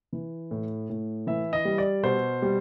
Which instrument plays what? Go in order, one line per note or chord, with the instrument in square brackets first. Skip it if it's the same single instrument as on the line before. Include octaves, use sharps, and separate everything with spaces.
[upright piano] E3
A2
A2
E3 E5
D#5
G3
D5
B2 C5
G3